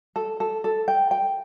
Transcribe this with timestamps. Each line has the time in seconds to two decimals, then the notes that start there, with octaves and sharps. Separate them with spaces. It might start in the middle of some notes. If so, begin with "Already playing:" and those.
0.16 A4
0.40 A4
0.64 A4
0.88 G5
1.11 G5